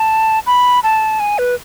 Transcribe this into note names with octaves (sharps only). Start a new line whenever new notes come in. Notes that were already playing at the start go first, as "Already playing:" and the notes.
Already playing: A5
B5
A5
G#5
B4